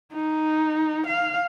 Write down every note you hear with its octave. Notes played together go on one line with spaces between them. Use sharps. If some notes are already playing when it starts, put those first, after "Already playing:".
D#4
F5